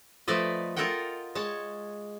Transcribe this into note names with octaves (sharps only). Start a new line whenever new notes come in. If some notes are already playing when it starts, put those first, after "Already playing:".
F3 A3 B4 D5 D#5
F4 A4 A#4 D#5 F#5 G5
G#3 C#5 A5